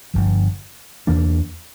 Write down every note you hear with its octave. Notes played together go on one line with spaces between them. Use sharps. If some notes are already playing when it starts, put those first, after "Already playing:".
G1 G2 F3
E2 E3 A#3 D4